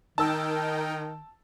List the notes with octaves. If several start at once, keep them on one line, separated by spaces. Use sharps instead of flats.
D#3 D#4 A#4 G5 A5 E6